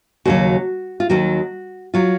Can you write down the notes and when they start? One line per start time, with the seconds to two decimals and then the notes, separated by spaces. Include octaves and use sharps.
0.25 D#2 C#3 F#3 F#4
1.00 F4
1.10 D#2 D#3 F#3 F#4
1.94 F#3 F4